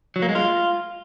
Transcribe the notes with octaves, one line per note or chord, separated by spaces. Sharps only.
F#3
A#3
G#3
F4